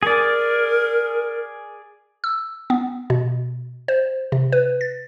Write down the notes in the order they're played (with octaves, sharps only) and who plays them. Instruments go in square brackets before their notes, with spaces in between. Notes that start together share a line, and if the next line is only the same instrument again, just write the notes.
[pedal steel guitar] G#4 D5 [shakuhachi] A#4
[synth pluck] E6
B3
B2
C5
C3
B4
A6